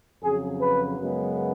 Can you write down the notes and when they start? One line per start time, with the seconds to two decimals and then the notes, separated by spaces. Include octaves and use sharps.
0.24 F2 C#3 F#3 G#4
0.61 B4
0.99 F#2 C#3 G#3 B3